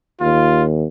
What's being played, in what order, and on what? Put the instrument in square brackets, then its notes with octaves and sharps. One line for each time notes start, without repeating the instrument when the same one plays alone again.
[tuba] D#2 [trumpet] F4